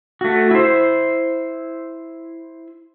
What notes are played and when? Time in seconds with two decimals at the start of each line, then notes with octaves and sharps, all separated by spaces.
0.21 A3 F#4
0.51 E4 C5